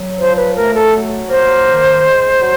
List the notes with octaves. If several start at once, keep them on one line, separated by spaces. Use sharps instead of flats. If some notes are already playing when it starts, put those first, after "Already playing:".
Already playing: F#3
F3 C5
B4
A3 A#4
A4
F#3
A#3 C5
D#3
G#3
F#3